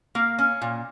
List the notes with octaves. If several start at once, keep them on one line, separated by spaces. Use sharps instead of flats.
A#3 F5
C#4
A#2